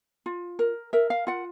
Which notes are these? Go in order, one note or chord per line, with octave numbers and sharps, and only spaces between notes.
F4
A#4
A#4 E5
F5
F4 F#5